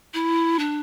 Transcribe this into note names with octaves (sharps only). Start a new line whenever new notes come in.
E4
D4